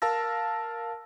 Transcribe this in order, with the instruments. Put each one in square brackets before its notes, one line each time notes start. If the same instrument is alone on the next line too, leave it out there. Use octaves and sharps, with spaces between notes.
[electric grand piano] A#4 F5 A5 E6 A#6